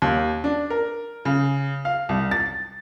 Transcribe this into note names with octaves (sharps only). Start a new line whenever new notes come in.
D#2
D4
A#4
C#3
F5
C2
A6